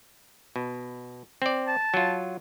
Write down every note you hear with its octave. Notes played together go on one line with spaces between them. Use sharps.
B2
C4 D5
A5
F#3 F4